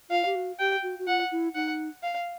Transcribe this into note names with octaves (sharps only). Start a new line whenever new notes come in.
F4 F5
G4
F#4
G4 G5
F#4
F#4
F4 F#5
E4
D#4 F#5
F5